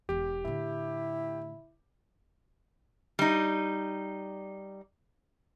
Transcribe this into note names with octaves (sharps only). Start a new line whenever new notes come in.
E1 E2 G4
A2 D3 E4
G3 D#4